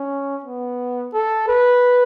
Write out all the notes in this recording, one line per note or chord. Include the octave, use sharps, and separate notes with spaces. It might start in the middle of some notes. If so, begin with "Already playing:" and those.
Already playing: C#4
B3
A4
B4